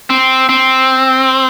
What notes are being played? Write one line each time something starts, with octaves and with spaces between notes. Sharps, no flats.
C4
C4